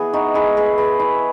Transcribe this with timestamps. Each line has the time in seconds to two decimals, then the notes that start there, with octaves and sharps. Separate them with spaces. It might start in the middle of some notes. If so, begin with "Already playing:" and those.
Already playing: E3 B3 G#4
0.13 D#4 F#4
0.35 E4 G#4
0.57 G#4 B4
0.78 G#4 B4
0.99 E4